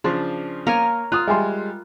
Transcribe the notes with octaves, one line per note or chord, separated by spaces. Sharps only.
C#3 F3 D4 C6
A#3 A#4 C#5 G#5
F4 D#6 F#6
G3 G#3 E5 G#5 C6